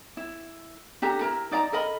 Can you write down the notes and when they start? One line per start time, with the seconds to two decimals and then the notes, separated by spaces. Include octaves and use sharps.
0.17 E4
1.02 D4 G4 A4 A#5
1.21 E4 A#4 A#5
1.51 D#4 D5 F5 A#5
1.72 A4 A#4 D#5 B5